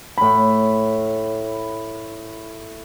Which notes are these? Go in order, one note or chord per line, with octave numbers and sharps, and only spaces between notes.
A2 B5